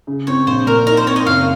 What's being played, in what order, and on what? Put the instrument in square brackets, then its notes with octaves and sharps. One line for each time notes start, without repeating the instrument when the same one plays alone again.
[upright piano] C#3
[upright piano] C4 [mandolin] C#5
[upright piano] A#1 [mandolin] C5
[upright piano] A#2 [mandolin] A#4
[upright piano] D#4 [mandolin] A#4
[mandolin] C5
[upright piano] C4 [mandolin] C#5
[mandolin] D#5
[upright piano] F#1 [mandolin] F5